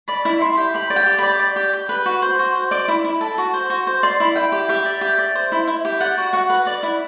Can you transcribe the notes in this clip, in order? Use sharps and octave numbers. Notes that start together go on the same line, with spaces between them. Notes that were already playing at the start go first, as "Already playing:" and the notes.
D5 B5
E4
E4 C6
G4
G4 B5
D5
G5
G4
D5 B5
D5
G4
G4
B4
F#4
C5
F#4
C5
D5 D6
E4
E4
A4
F#4
C5
F#4
C5
D5 C6
E4
E4 G5
G4
G4 E5
D5
G4
D5
C5
E4
E4
G4
D5 F#5
F#4
F#4 F#5
B4
D5
E4